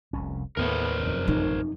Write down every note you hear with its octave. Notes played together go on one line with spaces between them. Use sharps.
F1 C2 C#4
D#2 A2 D#3 A3 B3 A#4 C5 C#5
F1 F#2
A1 B2 D#4